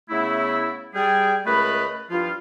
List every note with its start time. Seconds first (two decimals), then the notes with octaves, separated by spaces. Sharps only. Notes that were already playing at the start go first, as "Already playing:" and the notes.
0.09 C#3 A3 B3 E4
0.95 G3 G#4 G5
1.46 C#2 A3 A#4 B4 D#5 B5
2.11 G2 F3 E4 F4